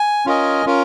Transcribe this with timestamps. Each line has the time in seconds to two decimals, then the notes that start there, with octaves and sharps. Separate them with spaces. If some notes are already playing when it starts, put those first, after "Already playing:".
Already playing: G#5
0.26 C#4 F4 A#4 D#5 G#5
0.66 C#4 F4 A#4